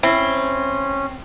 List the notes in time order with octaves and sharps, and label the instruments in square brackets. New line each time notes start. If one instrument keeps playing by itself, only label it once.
[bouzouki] C4 [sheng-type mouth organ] C#4 [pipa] E4